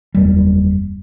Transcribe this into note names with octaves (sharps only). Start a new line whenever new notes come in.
F#1 E2 G3